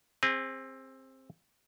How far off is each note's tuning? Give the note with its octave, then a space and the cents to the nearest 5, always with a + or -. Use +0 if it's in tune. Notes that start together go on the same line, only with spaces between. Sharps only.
C4 +15 G#4 -25